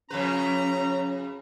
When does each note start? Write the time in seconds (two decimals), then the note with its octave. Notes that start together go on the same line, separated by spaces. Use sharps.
0.10 F2 C#3 C#4 B4 A#5